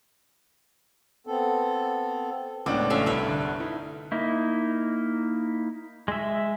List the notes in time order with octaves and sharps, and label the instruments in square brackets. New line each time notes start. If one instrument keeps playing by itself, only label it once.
[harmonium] B3 C4 A4
[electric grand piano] C#2 [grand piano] A2 D4 D6 [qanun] B3
[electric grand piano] A1 C#4 [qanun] A4 E5 F5
[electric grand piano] C2 G2 [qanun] A3 B4
[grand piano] D3
[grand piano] D#4 [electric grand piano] E4
[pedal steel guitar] A#3 D#4 E4
G#3 E5